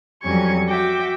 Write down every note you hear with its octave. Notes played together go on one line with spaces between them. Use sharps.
F2 F#3 G3 C#4 C#6 G#6
F#4 E5 G5 D6